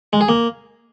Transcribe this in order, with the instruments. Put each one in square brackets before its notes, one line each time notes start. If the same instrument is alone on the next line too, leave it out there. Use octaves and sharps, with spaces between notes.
[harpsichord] G#3
G#4
A#3